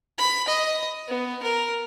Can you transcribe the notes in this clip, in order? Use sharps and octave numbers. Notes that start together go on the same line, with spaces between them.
B5
D#5
B3
A#4